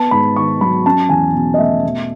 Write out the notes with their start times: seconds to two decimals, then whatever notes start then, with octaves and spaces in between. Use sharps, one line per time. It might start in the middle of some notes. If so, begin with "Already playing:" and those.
Already playing: B3 A5
0.11 G#2 B5
0.36 D#3 C#6
0.61 F#3 B5
0.86 C#4 A5
1.09 E2 G#5
1.34 B2
1.54 D#5
1.58 A3 E5
1.84 B2